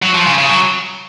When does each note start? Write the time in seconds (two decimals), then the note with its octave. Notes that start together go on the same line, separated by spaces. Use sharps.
0.02 F#3
0.14 F3
0.26 C#3
0.38 C#3
0.49 F#3